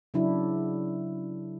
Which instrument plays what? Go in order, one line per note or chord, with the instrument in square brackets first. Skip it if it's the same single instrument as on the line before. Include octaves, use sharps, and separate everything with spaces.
[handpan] C#3 F#3 D4 E4